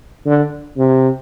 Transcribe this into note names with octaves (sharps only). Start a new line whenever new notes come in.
D3
C3